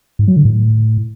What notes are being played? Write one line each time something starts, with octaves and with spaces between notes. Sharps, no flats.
G#2
F#3
D3
A2